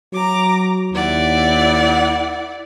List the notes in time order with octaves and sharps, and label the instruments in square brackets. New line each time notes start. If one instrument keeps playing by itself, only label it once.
[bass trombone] F#3 [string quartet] A#5 D6
[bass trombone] D#2 [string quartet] E4 D5 F#5